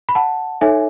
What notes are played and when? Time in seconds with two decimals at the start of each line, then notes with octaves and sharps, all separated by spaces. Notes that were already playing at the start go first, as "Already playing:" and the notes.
0.09 B5
0.15 F#5 A5
0.61 D#4 A4 C#5 E5 G#5